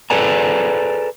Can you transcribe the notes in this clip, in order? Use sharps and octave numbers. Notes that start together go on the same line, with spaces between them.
G#4 A4 B4 D5 G#5 A#5